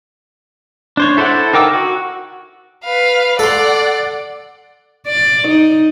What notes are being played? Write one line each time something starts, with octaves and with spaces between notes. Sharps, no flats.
D4 C5 C#5
E4 A4 C5 D5 F#5
D#4 A#4 G5 D6 E6
F#4
B4 F5
A4 D5 F#5 C6
D5
D#4